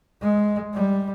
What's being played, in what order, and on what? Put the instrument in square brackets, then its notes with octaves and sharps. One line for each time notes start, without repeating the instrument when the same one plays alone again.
[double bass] G#3
G3